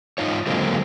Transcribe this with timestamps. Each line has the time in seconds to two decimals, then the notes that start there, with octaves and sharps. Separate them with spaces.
0.18 G#2 C3 D#4 F4 C#5
0.47 D3 F#3 G#3 A#3 C4